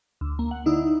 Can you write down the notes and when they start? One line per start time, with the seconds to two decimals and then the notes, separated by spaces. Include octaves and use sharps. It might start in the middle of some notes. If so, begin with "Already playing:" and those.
0.21 D2
0.39 A#3
0.51 F#5
0.66 D3 D#4 E4